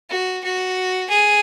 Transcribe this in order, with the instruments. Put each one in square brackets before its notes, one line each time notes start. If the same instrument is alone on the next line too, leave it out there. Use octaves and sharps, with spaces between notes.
[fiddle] F#4
F#4
G#4